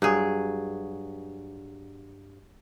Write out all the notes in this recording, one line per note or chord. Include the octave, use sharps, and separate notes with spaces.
G2 F#3 G#4